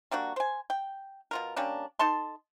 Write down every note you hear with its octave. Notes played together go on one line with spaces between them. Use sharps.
G3 A#3 D4 F#4
C5 G#5
G5
B2 F4 A#4
G3 A#3 C#4 D4
D#4 A4 A5 C6